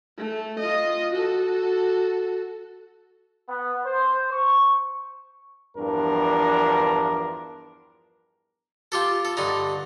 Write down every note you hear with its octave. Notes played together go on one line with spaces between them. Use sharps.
A3
F4 D#5
F#4 A4
B3
C5
C#6
E2 G2 F3 D4 A#4
F4 G4 A4
A4
G2 D3 D#4